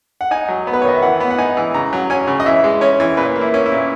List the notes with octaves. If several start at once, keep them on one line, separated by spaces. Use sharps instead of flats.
F#5
D#4 G#5
F#3
B3
B4
C#5
D#3 D#5
E5
E3 F#5
B3
F#5
D#4 G#5
E3
C#3 A#5
F#3
C#4 G#5
C#3
D#5
E3 E5
G#3
C#4 C#5
E3
A#2 B4
A#3
E4
C#4
E4
A#2